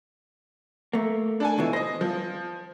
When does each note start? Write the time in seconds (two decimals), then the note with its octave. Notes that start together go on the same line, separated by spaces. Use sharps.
0.93 A3 A#3
1.40 D4 A4 G#5
1.58 C#2 B2 E3
1.73 C5 D#5 A#6
2.01 F3